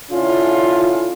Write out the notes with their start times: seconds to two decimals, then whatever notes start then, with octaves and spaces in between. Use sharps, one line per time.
0.11 D3 C#4 E4 F4